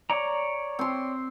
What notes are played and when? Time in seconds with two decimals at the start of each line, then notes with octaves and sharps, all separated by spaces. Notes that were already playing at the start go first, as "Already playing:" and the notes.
0.10 C#5 D5 A#5
0.79 C4 C6